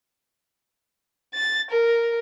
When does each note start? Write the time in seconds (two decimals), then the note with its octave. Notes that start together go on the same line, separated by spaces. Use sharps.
1.34 A6
1.71 A#4